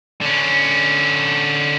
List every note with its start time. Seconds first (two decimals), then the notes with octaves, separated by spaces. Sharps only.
0.21 D3 C#4